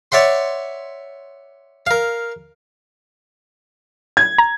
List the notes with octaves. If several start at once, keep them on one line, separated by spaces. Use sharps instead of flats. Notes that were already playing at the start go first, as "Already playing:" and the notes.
C#5 D5 E5 F#5 C6
A#4 F5
G#6
A#5